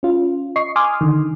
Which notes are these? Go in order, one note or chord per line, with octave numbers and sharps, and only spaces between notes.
C#4 F4
D#5 C#6 C7
G#5 C6 D6 D#6 F6
D3 D#3